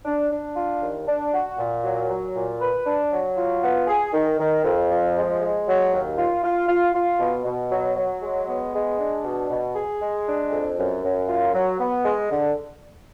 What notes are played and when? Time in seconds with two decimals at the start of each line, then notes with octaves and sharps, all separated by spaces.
0.05 D4
0.31 D4
0.56 F4
0.81 D#2
1.07 D4
1.33 F#4
1.58 A#2
1.84 F#3
2.09 F#3
2.35 A#2
2.60 B4
2.86 D4
3.12 F#3
3.37 F4
3.63 B3
3.87 G#4
4.13 D#3
4.39 D#3
4.64 F2
4.90 F3
5.16 G#3
5.41 G#3
5.66 F#3
5.92 D#2
6.18 F4
6.44 F4
6.68 F4
6.94 F4
7.19 B2
7.45 B2
7.71 F#3
7.96 F#3
8.22 G#3
8.47 B3
8.73 G#3
8.98 D4
9.24 B2
9.50 B2
9.75 G#4
10.01 G#3
10.27 D4
10.51 F2
10.77 F#2
11.03 F#2
11.28 F4
11.54 F#3
11.80 B3
12.05 G#3
12.30 D3